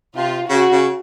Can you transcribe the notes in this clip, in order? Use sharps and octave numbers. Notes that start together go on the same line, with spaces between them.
C3 F4
C#3 F#4
C#3